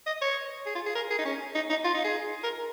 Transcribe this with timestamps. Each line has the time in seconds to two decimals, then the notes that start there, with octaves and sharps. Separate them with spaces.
0.06 D#5
0.22 C#5
0.66 G#4
0.75 F4
0.86 G#4
0.95 A#4
1.10 G#4
1.18 D#4
1.25 C#4
1.55 D#4
1.70 D#4
1.84 F4
1.94 D#4
2.04 G#4
2.43 A#4